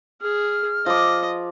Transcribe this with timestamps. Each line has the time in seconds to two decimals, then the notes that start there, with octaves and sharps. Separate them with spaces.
0.21 G#4 F6
0.86 F3 D#5 D6